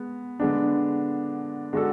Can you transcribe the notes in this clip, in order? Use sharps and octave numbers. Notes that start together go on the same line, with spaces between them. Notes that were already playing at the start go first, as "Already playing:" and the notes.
Already playing: G#3 B3
D3 G#3 B3 D4
D3 G#3 D4 F#4 A4